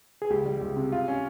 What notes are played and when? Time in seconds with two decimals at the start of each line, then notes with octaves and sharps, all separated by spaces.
0.22 G#4
0.30 C#2 G4
0.46 G3
0.61 C#2
0.76 C3
0.92 F4
1.08 C#4